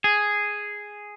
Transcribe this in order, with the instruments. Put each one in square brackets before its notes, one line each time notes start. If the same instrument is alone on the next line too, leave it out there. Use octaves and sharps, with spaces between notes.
[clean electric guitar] G#4